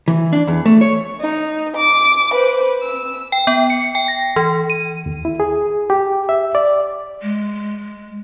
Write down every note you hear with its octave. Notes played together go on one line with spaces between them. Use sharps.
E3
D4
E2
A3
C#5
D#4
D6
B4 C5
E6
G5
B3
C#7
G5
A#6
E3
D#7
D#2
E4
G#4
G4
E5
D5
G#3